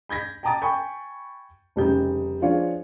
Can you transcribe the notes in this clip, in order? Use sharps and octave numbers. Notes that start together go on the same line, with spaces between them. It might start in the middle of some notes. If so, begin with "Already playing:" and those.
B5 G6 G#6 A#6 B6
G5 A5 A#5 D6 D#6 A6
G5 G#5 B5 C#6 G6
F1 C#3 G3 D#4 G6
F3 G#3 D4 F4 C#5